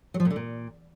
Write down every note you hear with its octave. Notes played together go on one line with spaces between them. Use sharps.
F#3
F3
A#2
D3
A#2